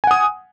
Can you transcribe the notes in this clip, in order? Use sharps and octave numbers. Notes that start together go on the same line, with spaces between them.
F#5 G#5 D#6